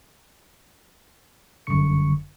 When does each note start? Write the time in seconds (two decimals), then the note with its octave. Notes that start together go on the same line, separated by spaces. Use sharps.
1.67 G1 F#2 D3 C#6 C#7